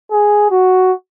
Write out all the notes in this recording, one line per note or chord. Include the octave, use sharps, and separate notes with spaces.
G#4
F#4